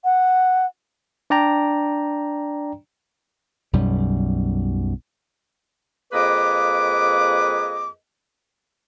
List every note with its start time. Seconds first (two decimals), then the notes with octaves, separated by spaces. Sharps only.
0.04 F#5
1.30 D4 D5 G5 A#5
3.73 B1 F#2 G3
6.12 F2 A#3 G#4 B4 D#5 D6